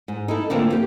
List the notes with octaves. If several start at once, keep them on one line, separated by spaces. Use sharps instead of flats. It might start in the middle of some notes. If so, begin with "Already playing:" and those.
G#2
D#4 E4 A4
D3 E3 F3 A3 A#3 C4
A#3 G4